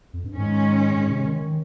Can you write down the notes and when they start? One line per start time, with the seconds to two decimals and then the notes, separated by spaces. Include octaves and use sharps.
0.13 F2
0.24 G2
0.35 G#2 D#3 G#3 C#4
0.96 G#2
1.11 C3
1.26 D#3
1.41 D#3